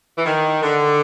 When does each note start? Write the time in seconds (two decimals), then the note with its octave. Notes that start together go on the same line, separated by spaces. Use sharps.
0.16 E3
0.25 D#3
0.62 D3